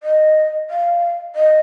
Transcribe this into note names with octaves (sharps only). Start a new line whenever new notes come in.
D#5
F5
D#5